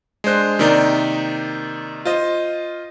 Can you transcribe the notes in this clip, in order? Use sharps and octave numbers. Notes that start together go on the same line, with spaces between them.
G#3 D4 C5 F#6
C3 D#3 A#3 D#4 D5
F4 C5 D#5